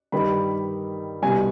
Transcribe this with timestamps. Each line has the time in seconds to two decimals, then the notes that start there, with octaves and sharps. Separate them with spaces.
0.12 G2 D#3 G3 B5
1.22 C2 B2 G3 G#5